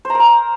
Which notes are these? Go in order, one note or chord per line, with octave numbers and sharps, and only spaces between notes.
C5
A#5
A#4
A#5